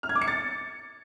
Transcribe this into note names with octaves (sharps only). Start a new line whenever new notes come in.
F6
G#6
D6
C#7
A6